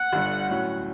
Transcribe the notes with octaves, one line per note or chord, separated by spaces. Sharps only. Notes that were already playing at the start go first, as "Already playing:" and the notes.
Already playing: F#5
G1 G2 D3
A2 F#3 C#4